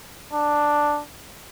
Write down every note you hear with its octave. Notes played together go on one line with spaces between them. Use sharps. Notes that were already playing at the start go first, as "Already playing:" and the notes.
D4